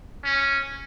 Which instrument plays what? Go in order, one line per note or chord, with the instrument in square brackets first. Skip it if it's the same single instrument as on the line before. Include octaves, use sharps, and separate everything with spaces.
[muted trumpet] C#4